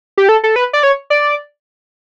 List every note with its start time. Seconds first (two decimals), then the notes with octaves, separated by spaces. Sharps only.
0.18 G4
0.29 A4
0.44 A4
0.56 B4
0.73 D5
0.83 C#5
1.10 D5